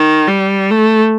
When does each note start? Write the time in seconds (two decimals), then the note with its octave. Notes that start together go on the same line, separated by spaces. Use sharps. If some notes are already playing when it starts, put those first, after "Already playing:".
Already playing: D#3
0.28 G3
0.71 A3